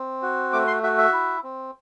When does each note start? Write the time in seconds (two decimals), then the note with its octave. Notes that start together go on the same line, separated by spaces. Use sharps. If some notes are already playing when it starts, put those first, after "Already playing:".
Already playing: C4
0.22 F#4
0.53 A3 D6
0.68 C6
0.83 F#4 E5
0.98 E5
1.13 E4
1.44 C4